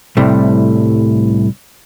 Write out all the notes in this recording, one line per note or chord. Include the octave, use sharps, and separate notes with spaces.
C2 A2 C3 G3 A3